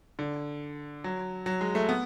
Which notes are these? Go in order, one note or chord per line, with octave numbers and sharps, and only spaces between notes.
D3
F#3
F#3
G#3
A3
B3